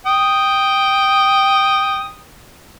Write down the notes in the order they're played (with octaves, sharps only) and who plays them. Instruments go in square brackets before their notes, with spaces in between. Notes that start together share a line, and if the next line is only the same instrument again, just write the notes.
[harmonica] G5 D#6